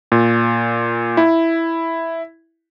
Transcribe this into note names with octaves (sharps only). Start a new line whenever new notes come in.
A#2
E4